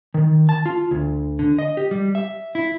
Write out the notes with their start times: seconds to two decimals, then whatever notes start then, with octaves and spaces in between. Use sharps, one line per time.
0.14 D#3
0.49 A5
0.66 F4
0.91 D2
1.39 D3
1.59 D#5
1.77 G4
1.91 G3
2.15 E5
2.55 E4